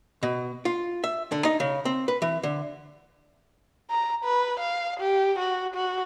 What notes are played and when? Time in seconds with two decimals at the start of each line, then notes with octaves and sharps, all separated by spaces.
0.23 B2
0.65 F4
1.04 E5
1.32 D3
1.45 D#4
1.60 C#3
1.85 C4
2.08 B4
2.22 E3
2.43 D3
3.91 A#5
4.24 B4
4.60 F5
5.00 G4
5.39 F#4
5.75 F#4